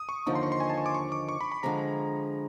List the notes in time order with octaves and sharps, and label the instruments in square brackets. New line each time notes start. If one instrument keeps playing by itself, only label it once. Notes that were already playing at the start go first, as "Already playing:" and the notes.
Already playing: [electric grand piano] D#6
C#6
[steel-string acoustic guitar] D#2 D3 F3 A#3 D#4 [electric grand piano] C#6
[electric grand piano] C6
C#6
C6
G#5
A5
C#6
D6
C#6
D6
C#6
B5
B5
[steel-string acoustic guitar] D3 F3 G#3 [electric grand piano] A#5